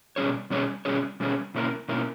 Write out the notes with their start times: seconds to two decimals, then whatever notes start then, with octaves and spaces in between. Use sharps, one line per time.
0.16 B2 G3 C#4 G#4 C#5
0.50 B2 G3 C#4 G#4 C#5
0.85 B2 G3 C#4 G#4 C#5
1.20 B2 G3 C#4 G#4 C#5
1.55 B2 A#3 C#4 E4 A#4
1.88 B2 A#3 C#4 E4 A#4